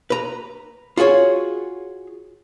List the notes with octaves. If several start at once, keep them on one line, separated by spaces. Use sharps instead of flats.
B4 A#5
F4 F#4 G#4 C#5